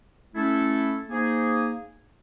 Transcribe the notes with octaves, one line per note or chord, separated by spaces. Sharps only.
A3 C#4 E4 A4
A#3 D#4 G#4 C5